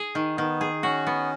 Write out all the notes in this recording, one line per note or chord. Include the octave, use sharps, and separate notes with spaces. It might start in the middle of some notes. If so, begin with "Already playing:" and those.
Already playing: G#4
D#3
D#3 B3
G#4
C#4 F#4
B3